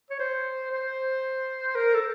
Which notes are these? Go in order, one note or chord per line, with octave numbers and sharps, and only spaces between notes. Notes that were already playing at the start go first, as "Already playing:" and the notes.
C#5
C5
C5
A#4
A4